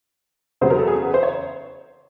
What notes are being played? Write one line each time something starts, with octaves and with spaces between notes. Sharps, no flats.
E2 C#3 F#3 C5
A#4
A4
G#4
B4
C5
C#5